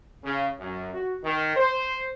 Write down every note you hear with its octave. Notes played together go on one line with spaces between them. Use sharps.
C#3
F#2
F#4
D#3
C5